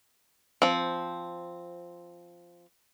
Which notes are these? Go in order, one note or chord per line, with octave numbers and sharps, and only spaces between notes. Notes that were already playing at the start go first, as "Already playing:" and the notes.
F3 C4